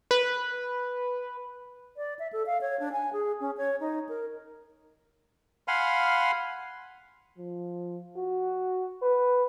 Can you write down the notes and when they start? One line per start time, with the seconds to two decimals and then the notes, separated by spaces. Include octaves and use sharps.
0.11 B4
1.97 D5
2.19 E5
2.33 A4
2.46 F5
2.61 C#5
2.80 D4
2.92 G#5
3.13 G#4
3.40 C#4
3.57 C#5
3.80 D#4
4.09 A#4
5.68 F5 F#5 G#5 B5 C6 F6
7.38 F3
8.16 F#4
9.02 B4